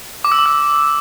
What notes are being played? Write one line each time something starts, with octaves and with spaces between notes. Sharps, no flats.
D6
E6
D6
E6